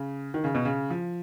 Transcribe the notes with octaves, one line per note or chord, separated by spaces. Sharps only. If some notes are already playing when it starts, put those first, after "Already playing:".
Already playing: C#3
D#3
C#3
B2
C#3
F3